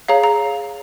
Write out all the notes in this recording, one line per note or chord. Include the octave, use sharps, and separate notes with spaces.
G#4 C#5 F5 A#5
A#5